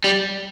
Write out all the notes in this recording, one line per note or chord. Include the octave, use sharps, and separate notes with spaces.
G3